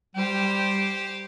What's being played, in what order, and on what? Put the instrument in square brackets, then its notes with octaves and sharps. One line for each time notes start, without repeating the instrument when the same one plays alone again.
[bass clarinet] G3 [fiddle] G4 C5